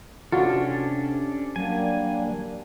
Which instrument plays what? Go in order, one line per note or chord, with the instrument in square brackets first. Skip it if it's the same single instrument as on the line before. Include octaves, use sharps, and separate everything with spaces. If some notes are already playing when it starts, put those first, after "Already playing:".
[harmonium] C3 [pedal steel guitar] C#4 D4 A4 [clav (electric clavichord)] F4 F#4
[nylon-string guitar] F#3 [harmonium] G3 A#3 D4 [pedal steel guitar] G#5